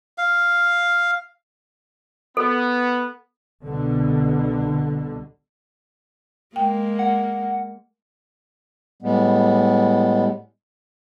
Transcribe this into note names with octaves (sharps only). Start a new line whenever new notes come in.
F5
B3 A4
C2 B2 D3
G#3 A#3 G5
F#5
A2 G3 G#3 B3